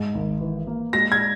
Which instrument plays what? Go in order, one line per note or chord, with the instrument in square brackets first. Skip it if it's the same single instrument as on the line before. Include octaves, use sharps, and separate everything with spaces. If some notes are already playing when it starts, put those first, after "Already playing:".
Already playing: [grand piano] G#2
G#1
E3
A#3
[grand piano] G#3 [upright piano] A#6
[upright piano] G#6